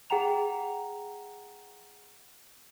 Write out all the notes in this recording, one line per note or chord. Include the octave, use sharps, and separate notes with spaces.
G#4 F#5 G5 A#5 F7